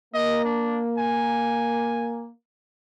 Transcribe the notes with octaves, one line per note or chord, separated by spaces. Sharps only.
A#3 D#5
D4
G#5